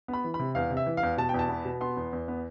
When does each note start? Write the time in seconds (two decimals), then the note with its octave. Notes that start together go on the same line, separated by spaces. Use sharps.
0.08 B3
0.13 B5
0.24 E3
0.34 B5
0.39 C3
0.55 E2 F5
0.70 C3
0.77 E5
0.86 E3
0.97 F5
1.03 E2
1.17 B2 A5
1.29 E2 G5
1.39 A5
1.49 B3
1.65 B2
1.81 B3 C6
1.97 E2
2.13 E2
2.28 B3